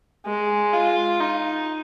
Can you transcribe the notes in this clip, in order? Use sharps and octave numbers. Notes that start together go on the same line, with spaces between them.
G#3
F4
D#4